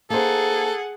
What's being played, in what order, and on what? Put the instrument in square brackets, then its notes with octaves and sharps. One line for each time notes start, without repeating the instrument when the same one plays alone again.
[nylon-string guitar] A#3 D#4 C5 [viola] G#4 F#5 [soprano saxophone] A4